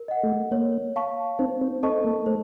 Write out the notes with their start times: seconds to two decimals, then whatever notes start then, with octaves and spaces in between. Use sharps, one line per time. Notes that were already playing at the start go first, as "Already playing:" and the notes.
Already playing: A#4
0.08 D#5 F#5
0.23 A3
0.51 A#3 C#5
0.96 F5 A5 C#6
1.39 C4 D#4
1.61 C4
1.83 C4 A4 D#5 A5 C#6
2.05 A#3
2.26 A3 C5